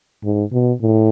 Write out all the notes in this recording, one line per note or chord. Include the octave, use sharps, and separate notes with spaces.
G#2
B2
A2